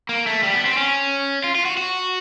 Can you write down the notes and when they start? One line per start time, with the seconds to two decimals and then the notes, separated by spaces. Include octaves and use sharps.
0.09 A#3
0.27 A3
0.43 G3
0.54 B3
0.65 C4
0.77 C#4
1.44 F4
1.55 F4
1.65 F#4
1.77 F#4